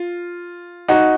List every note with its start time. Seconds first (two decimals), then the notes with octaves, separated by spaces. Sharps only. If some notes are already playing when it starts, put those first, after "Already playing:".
Already playing: F4
0.88 D#4 F#4